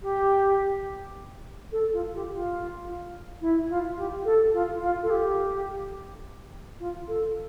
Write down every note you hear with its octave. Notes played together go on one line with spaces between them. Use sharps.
G4
A4
F4
G4
F4
E4
F4
G4
A4
F4
F4
A4
G4
F4
A4